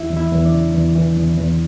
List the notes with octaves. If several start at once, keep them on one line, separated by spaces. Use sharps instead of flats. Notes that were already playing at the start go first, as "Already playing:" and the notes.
Already playing: E2 E4 E5
E2
E4 E5
E2
D4 D5
C#3
E2
E3
E2
E2